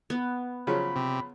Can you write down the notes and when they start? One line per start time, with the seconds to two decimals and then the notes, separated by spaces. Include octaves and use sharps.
0.10 B3
0.67 C#3 F3 F#3 B5
0.96 C3